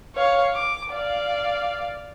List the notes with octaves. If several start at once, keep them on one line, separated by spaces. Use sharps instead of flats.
C#5 F5
D6
D5 F5